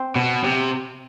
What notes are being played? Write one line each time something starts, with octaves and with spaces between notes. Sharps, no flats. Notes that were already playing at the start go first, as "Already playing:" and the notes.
Already playing: C4
B2
C3